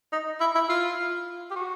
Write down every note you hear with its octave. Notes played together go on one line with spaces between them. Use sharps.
D#4
E4
E4
F4
G4
F#4